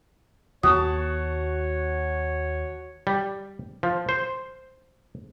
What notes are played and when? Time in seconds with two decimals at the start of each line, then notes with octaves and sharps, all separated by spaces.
0.63 D#2 A#3 F#4 C#5 A5 D#6
3.07 G3
3.83 F3
4.09 C5